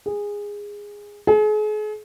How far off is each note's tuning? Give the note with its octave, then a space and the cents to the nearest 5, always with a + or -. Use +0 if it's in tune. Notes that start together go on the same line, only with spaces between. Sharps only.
G#4 -15
G#4 +40